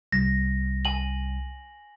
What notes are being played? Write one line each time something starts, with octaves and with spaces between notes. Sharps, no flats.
C2 A#6
G#5 F#7